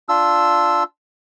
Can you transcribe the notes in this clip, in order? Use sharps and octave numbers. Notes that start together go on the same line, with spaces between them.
D4 F4 E6